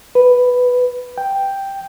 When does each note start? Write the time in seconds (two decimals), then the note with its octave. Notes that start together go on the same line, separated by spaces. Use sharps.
0.15 B4
1.18 G5